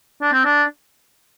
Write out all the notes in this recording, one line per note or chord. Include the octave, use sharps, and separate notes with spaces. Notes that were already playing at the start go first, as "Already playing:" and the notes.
D4
C4
D4